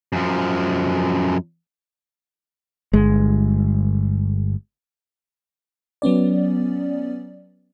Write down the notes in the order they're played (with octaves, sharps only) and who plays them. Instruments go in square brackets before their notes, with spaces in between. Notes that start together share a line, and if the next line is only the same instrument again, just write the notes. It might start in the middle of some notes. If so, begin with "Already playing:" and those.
[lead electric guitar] F#2 F3
[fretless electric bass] G1 G#3
[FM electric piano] F#3 B3 C#4 D5